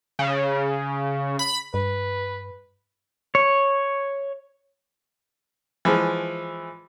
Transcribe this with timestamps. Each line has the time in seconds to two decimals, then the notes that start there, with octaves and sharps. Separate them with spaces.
0.19 C#3
1.39 B5
1.74 G2 B4
3.35 C#5
5.85 E3 F3 G#3